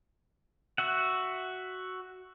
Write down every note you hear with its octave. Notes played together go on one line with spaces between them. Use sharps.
F#4 E5 F#5